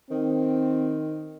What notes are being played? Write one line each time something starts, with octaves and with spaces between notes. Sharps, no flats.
D#3 C4